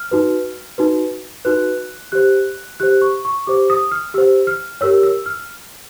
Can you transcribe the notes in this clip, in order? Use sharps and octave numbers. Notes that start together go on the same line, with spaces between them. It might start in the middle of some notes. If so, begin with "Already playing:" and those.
Already playing: F6
D#4 F#4 B4
D#4 F#4 B4
D#4 F#4 B4 F#6
G4 C5 F#6
G4 C5 F#6
C#6
C#6
G4 C5 D6
D#6
F6
G4 C5 E6
F6
G4 A#4 C#5 E6
E6
F6